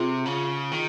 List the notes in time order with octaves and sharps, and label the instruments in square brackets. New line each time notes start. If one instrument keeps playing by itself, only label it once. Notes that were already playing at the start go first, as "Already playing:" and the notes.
Already playing: [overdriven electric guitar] C3 [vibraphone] F4 G#4
[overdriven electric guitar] C#3
D#3